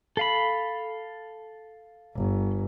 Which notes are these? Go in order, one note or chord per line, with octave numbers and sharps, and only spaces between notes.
A4 F5 B5
G1